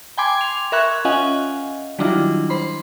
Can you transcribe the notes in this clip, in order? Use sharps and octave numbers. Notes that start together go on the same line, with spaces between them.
G5 G#5 B5 C6 D6 G#6
C6 F7
A#4 E5 B5 C#6 F#6 G#6
C#4 F4 D#5 F5 F#5 G#5
D#3 F#3 G3 D4 E4 F4
C5 B5 C6